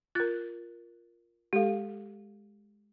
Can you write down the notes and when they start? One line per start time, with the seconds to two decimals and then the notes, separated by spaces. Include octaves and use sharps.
0.15 F4 A#4 F#6 A6
1.53 G#3 G4 A4 F5